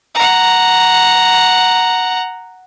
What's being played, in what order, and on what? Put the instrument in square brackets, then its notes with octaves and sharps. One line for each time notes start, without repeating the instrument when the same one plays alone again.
[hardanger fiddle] F#5 A#5